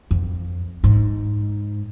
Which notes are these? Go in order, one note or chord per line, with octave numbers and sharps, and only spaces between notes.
F2
G#2